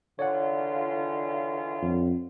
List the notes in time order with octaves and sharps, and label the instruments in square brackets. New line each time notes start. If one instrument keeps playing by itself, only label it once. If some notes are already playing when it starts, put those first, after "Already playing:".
[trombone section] C#2 E3 F4 [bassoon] D3 [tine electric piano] C#5 D5 F#5
[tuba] F2